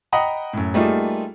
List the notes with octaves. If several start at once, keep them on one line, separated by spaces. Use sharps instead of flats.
D#5 F#5 G5 A#5 B5 D#6
F#2 A2
G3 A3 A#3 D#4 F4 G#4